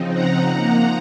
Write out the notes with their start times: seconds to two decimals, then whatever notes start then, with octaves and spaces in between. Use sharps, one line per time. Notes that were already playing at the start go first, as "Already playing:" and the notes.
Already playing: C#3 F3 C4 D#4
0.10 F#5 A#5
0.50 F3 A#3 D#4